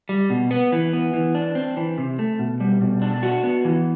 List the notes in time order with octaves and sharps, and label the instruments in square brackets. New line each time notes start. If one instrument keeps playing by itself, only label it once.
[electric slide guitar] G3
B2
B3
E3
B3
E3
D4
C4
E3
C3
A3
B2
G3
B2
D4
F#4
B3
E3